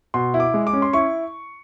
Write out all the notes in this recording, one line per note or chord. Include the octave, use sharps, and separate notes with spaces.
B2 C6
E4
D6
G#3
D6
C#4
C6
E4 C#6